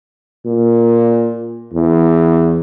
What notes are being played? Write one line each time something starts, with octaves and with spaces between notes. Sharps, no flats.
A#2
E2